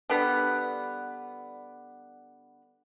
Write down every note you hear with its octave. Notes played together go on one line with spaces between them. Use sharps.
D3 G3 B3